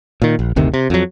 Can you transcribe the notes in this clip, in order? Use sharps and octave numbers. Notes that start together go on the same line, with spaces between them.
A#2 D#3
A#1
F#1 D2 C3 D#3
C3
F2 F#3